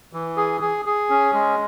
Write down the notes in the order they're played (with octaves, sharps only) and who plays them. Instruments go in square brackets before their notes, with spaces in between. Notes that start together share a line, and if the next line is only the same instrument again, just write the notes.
[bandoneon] E3
G#4
G#4
G#4
C#4
G#3